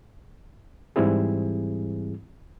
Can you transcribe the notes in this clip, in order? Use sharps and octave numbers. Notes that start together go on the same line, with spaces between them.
G#2 E3 G3 C4 E4 G#4